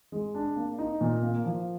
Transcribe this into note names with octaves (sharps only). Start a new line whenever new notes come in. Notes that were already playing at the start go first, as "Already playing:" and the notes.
G#3
D4
A#3
D#4
A#2
A#3
F3